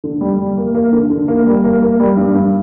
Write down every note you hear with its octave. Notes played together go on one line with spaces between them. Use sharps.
D3
G3
G3
A#3
A#3
D3
D3
A#3
G3
A#3
A#3
G3
G2
G2